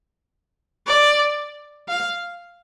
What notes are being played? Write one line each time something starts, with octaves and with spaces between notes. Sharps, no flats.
D5
F5